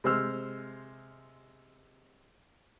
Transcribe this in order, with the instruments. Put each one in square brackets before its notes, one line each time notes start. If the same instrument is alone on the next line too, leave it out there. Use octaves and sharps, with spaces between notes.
[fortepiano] C3 G#3 C5 E6 F6